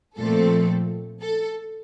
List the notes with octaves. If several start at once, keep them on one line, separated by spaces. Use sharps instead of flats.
A#2 F3 A3 C4 A4
A4